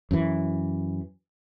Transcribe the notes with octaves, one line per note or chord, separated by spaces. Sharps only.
F#2 E3